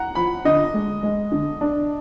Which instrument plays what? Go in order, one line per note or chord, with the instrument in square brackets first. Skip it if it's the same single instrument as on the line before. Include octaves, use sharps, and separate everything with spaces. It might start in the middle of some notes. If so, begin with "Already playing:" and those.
Already playing: [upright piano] F#5 A#5
[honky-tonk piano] F3 [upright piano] B5
[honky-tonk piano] D3 [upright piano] D#5
[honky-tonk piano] G#3
G#3
D3
D4